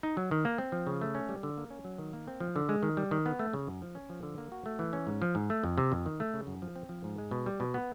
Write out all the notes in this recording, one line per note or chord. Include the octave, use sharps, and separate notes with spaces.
D#4
F#3
D#3
A#3
C4
F3
C#3
A3
C#4
G3
D3
A#3
C#4
F#3
D#3
A#3
C4
F3
D3
G#3
D#3
G3
D#3
B3
A3
C#3
F#2
F3
C#4
F3
D3
A#3
F#4
A3
E3
C#4
G#2
F3
G#2
A3
F2
C3
F2
D#3
A3
C#3
F#2
F3
C4
F3
G#2
G#3
B2
G3
B2
B3